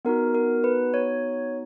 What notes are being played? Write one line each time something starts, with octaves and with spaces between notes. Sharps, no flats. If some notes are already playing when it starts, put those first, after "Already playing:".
B3 D#4 F#4 A#4
A#4
B4
C#5